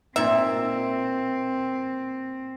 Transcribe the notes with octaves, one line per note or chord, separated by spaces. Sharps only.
A#2 C4 D#4 E5